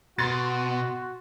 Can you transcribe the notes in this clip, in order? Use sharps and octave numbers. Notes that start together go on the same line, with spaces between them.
B2 F#4 C6 A6